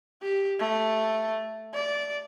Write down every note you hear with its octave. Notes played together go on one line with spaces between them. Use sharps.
G4
A3
D5